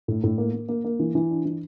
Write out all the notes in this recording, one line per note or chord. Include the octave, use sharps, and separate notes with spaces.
A2
A2
A#3
A#3
A#3
A#3
E3
E3
D4
E3